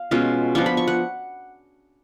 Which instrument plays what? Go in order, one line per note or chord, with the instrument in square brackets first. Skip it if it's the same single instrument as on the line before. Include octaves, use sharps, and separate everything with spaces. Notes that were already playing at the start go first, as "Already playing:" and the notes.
Already playing: [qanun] F5
B2 G#3 C#4 F4
F3 B3 D4 F4 C#6
B5
C#6
F#5